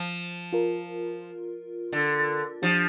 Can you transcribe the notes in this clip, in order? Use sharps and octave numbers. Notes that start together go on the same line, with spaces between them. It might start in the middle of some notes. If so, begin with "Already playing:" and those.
Already playing: F3
F4 A#4
D3
F3 D4 G4